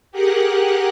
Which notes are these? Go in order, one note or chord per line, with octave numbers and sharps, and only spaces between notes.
G4 G#4 A#4 F#5 F#6